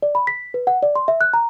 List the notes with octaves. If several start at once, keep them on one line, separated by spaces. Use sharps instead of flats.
D5
B5
B6
B4
F#5
D5
C6
E5
F#6
A#5